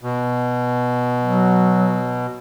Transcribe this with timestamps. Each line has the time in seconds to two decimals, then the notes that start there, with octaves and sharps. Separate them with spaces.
0.01 B2
1.22 F#3